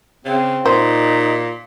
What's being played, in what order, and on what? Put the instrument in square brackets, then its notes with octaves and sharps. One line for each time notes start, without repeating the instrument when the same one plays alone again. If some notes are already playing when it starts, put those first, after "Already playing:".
[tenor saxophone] C#3 [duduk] C4
[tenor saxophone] A#2 [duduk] D#4 [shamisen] C5